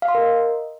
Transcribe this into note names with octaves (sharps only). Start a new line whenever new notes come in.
F5
C6
A#4
D#5